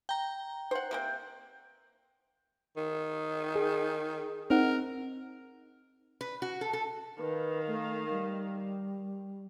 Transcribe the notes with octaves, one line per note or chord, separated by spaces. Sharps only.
G5 A#5
C5 F#5
C3 A#3 G5
D#3
G#4
C4 D#4 A#4 F#5
B4
F#4
A4
A4
D#3 B4 F5
A3
G3